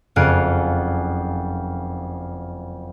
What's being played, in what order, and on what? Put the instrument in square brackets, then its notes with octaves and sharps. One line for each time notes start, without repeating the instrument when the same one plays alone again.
[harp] F#1 F2 F5 G#5 F#6 D7